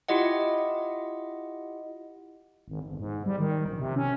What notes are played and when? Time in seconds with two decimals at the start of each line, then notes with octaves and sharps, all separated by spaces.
0.08 E4 F4 G4 D#5 F#5
2.68 G#1
2.85 G1
3.00 G#2
3.26 G3
3.39 D#3
3.65 A#1
3.79 C3
3.96 C#4